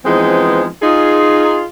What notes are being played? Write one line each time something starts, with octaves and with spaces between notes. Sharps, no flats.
E3 F3 G#3 B3 C4 D#4
D#4 F4 G#4